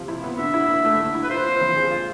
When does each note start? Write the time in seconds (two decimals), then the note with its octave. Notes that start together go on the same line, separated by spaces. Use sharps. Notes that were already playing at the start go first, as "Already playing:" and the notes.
Already playing: C3 F3
0.08 E4
0.24 B3
0.39 D3 E5
0.54 E4
0.70 D3
0.85 A3
1.00 D3
1.15 E4
1.24 B4
1.30 F4 C5
1.46 C4
1.61 F3
1.76 G#3
1.91 F4